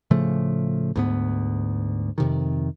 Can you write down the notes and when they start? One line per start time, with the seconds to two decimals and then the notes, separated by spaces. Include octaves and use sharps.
0.11 A2 C#3 F3 A3
0.96 D2 G#2 B3
2.18 F2 C3 D#3